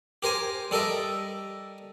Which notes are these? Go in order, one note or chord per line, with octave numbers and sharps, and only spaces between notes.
G4 A#4 C5 G#5
G3 A4 A#4 D#5 E5